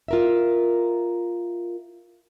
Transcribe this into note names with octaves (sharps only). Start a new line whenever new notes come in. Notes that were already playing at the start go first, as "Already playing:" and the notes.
F4 A#4 E5